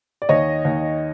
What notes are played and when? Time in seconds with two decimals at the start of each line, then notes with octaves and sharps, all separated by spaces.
0.22 D5
0.29 D#2 C#5 D#5
0.65 D#2